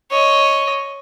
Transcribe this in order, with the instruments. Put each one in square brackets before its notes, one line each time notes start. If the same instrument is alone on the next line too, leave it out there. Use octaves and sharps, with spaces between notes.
[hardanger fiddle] C#5 D#5